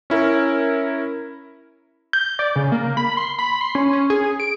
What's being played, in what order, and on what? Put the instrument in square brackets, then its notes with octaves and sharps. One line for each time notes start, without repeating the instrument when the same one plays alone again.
[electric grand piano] C#4 E4 A#4
[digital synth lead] G6
D5
C#3
A#3
B5
C6
B5
C6
C#4
C#4
G#4
D7